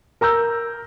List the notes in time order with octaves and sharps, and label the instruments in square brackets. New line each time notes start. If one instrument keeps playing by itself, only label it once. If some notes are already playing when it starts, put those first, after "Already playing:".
[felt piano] A#4 A#5 E6 G6